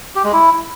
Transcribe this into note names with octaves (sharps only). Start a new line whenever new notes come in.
G4
G#3
E4